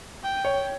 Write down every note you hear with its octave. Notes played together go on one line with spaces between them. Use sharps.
G5
C#5